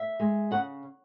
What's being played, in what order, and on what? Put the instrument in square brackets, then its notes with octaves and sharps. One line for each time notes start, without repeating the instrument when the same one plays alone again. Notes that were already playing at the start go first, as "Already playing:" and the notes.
Already playing: [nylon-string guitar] E5
G#3
C#3 F#5